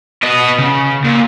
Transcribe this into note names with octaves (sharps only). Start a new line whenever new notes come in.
B3 D#5
C#3
A#2